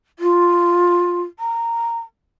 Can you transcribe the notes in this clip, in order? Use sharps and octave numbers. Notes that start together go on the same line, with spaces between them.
F4
A#5